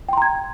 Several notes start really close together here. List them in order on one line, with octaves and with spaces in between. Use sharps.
G5 C6 A#5 G#6